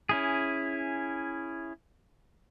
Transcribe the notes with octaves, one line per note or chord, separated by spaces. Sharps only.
C#4 E4 G#4